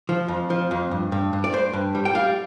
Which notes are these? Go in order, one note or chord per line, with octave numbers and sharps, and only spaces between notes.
F3
F2
F3
F2
G2
G2
G2
D5
G2 C5
G2
G3
G5
G3 F5